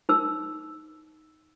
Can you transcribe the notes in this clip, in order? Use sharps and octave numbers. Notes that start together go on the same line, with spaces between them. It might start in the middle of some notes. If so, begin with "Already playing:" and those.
D#4 E6